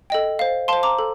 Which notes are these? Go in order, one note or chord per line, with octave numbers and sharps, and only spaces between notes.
A4 D#5 G5
C5 F5
C5 F5 A5 C6
A#5 D6
A4